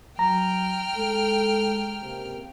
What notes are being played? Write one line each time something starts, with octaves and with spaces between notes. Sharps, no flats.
F#3 G5 A#5 F6
G#3 A4
C#2 C3 A#3